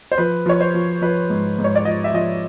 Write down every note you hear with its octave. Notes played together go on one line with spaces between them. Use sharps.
C5
F3 B4
F3 C#5
C5
F3
F3 B4
G#2
G#2
C#5
D5
F3 D#5
E5
F3 D#5